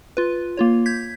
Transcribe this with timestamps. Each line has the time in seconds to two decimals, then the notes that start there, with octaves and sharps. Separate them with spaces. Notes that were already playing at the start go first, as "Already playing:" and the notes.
0.17 F4 B4
0.57 A#3 F4 C#5
0.86 G6 G#6 B6